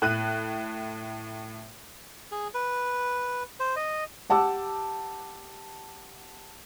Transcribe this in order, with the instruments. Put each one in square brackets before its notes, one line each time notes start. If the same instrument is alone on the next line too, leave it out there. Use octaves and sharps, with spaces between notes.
[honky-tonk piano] A2 F#6 D#7
[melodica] G#4
B4
C5
D#5
[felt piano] G4 F#5 A5 D6 E6